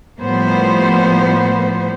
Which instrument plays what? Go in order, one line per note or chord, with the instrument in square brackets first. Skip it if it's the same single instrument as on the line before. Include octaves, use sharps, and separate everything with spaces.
[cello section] A2 F3 G3 A#3 B3 C5